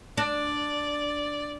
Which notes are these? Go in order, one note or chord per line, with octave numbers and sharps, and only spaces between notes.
D4 D5